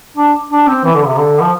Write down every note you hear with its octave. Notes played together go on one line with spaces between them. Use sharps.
D4
D4
C4
E3
D3
C3
D3
F3